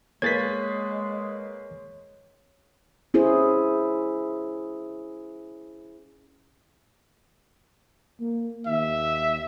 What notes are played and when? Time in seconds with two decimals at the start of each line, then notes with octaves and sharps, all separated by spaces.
0.22 G#3 A#3 G#4 B4 C#5 G#6 A6 B6
3.14 C#4 E4 G#4 C5
8.20 A#3
8.67 D#2 E5